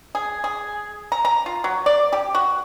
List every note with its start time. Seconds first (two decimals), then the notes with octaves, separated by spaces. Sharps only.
0.15 G#4
0.44 G#4
1.12 A#5
1.25 A#5
1.46 F4
1.64 F#3
1.86 D5
2.13 G4
2.35 F#4